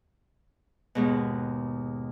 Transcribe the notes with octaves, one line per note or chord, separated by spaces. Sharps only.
D#2 G#2 B2